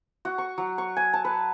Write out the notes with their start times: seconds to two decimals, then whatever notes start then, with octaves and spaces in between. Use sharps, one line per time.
0.25 F#4
0.38 C#6
0.58 F#3
0.78 C#6
0.96 G#5
1.13 A5
1.25 B4